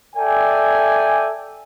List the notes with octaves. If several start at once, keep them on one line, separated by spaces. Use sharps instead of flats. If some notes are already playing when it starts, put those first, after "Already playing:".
A4 D5 E5 G5 G#5